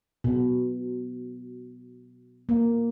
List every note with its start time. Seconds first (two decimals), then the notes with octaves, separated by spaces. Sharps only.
0.24 B2
2.49 A#3